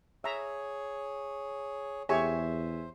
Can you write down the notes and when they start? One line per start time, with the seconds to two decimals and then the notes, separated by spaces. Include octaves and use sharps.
0.24 G#4 C#5 E5 A#5
2.09 E2 G4 G#4 C5 C#5 E5 G#5 C#6